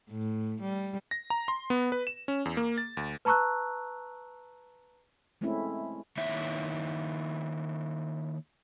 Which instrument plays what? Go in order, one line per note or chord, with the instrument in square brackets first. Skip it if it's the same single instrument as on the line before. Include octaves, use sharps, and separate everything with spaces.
[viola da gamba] A2
G3
[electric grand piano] A#6
A#5
C6
B3
B4
E7
C#4
E2
A#3
A6
D2
[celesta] B4 A5 A#5 C#6 E6 F#6
[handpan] G#3 A3 C4 C#4 E4
[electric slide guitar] D#3 A#3 D#4 E4 C#5 E5